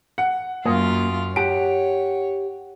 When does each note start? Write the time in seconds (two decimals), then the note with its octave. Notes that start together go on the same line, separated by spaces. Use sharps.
0.18 F#5
0.66 F#2 A#3 F4 D#6
1.36 G4 C#5 F#5 D7